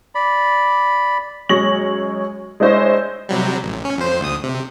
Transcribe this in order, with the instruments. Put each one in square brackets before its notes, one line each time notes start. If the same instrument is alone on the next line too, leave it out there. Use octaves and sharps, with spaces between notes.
[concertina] D5 B5
[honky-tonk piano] F#2 G#3 C#5 C#6 A#6 F#7
G#3 D4 E4 C5 C#5 D#5
[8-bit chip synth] C3 F#3 G3
A1
C#4
F2 C5
D2 D#6
C3